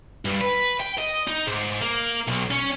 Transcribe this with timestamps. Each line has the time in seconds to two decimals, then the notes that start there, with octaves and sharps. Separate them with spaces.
0.25 G2
0.41 B4
0.80 G5
0.98 D#5
1.28 D#4
1.47 G#2
1.81 A#3
2.27 B1
2.51 C#4